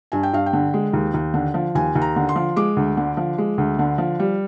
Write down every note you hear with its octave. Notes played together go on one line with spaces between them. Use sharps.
G2 G#5
G5
G2 F5
G5
D3
G#3
D#2
D#2
D3
F3
D#2 G#5
D#2
A#5
D3
C6
F3
G#3 D6
D2
D3
F3
G#3
D2
D3
F3
G3